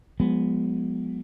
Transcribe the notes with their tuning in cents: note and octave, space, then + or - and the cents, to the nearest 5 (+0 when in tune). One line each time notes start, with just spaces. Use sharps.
F3 +40 G#3 +0 B3 +0